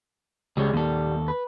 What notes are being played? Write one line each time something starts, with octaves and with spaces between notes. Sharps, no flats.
C#2 G3 G#3 C#5
D#2 A#2 G3 A4
B4